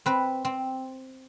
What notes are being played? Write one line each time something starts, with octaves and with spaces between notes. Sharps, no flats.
C4 B4
C4